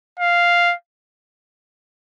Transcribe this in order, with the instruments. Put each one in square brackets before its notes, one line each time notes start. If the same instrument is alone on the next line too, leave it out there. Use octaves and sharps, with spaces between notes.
[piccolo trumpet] F5